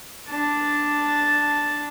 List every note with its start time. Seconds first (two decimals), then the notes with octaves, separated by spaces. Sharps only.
0.29 D4 A5